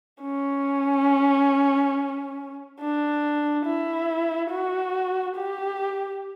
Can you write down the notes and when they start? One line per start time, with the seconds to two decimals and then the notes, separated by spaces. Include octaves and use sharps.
0.21 C#4
2.80 D4
3.65 E4
4.51 F#4
5.36 G4